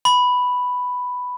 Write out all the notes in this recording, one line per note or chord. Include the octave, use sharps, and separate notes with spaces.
B5